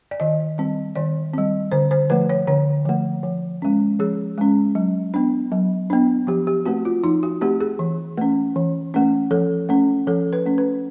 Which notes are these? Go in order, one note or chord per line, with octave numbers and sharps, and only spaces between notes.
D5
D#3 D#5
G3 C4
D#3 D5
G3 C4
D3 C5
C5
F3 A3 B4
C#5
D3 C#5
F3 A3
F3
G#3 C#4
F3 G#4
G#3 C#4
F#3
B3 D4
F#3
B3 D4
F3 G4
G4
A3 C4 F#4
F4
F3 D#4
F#4
A3 C4 G4
G#4
E3
A3 C#4
E3
A3 C#4
F3 A4
A3 C#4
F3 A4
B4
A3 C#4
B4